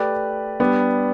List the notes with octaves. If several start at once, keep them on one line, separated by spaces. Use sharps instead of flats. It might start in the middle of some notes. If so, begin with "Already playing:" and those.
Already playing: A3 G4 B4 D5
G3 B3 D4 G4